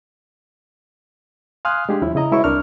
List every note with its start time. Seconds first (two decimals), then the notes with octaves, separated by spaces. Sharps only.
1.65 F5 G#5 C6 D#6 F6 F#6
1.89 G#3 D4 G4 G#4
2.02 D#2 F3 C#4 E4
2.15 C#3 E4 D#5 A#5
2.32 G#3 E4 F#4 B4 C#5 C#6
2.44 C2 D4 A#4 C#6 F6